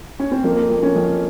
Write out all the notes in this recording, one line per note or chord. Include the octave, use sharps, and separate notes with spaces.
C#4
C4
F2 A#3
F2
C#4
F2